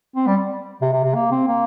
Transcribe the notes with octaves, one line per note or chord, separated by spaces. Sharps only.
C4
G3
C3
C3
C3
A#3
C4
A#3